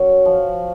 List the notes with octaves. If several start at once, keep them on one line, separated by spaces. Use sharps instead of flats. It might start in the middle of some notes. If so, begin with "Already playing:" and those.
Already playing: F#2 C#5
F3